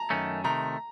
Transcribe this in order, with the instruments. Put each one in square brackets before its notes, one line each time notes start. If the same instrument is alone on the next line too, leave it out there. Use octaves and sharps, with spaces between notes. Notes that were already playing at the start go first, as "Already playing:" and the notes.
Already playing: [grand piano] A5 A#5
[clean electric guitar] F#2 D#3 A3 C#4
[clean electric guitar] C3 D#3 A3 [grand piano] A#5